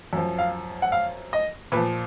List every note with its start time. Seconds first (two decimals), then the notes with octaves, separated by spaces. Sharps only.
0.13 F#2 F3
0.39 F5
0.82 F#5
0.92 F5
1.33 D#5
1.72 A#2 B4
1.77 F3